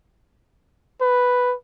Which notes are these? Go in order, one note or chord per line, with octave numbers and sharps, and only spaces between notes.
B4